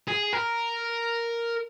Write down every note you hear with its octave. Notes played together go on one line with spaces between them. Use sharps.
G#4
A#4